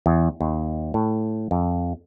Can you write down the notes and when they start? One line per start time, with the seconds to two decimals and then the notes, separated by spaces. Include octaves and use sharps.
0.06 E2
0.41 D#2
0.94 A2
1.51 F2